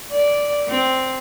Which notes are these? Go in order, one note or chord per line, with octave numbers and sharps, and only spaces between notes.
D5
C4